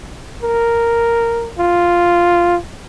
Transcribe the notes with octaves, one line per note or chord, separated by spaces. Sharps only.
A#4
F4